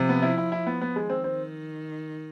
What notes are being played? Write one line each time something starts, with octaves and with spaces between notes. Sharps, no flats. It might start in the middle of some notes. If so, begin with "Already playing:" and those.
Already playing: C3 F3
B3
E4
E4
E4
B3
B3
D#3 G#3
C4
C4